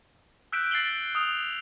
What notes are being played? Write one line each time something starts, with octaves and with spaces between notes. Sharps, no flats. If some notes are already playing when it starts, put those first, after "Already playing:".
E6 F#6 G6 B6 D7 E7
G#6 A6 C7 D7 F#7 G7
D#6 F6 F7